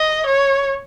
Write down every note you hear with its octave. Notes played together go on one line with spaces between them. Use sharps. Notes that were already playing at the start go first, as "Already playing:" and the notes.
Already playing: D#5
C#5